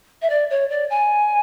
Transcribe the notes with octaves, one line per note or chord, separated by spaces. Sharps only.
E5
D5
C#5
D5
G#5